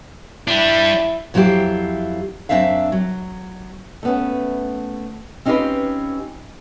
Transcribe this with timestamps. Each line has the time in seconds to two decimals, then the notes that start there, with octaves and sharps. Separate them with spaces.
0.48 G3 D4 E4
1.34 F2 F#3 E4 F4 G4
2.49 F#2 F#3 C4 D4 E5 F5
2.92 F#3
4.03 A3 B3 C#4
5.45 C4 C#4 D#4 F4 G4 B4